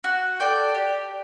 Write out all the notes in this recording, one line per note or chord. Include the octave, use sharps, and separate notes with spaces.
F#4
A4 D5 G5
G4